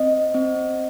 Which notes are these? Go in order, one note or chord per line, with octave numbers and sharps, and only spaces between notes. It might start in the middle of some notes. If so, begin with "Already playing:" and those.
Already playing: C4 D#5
C4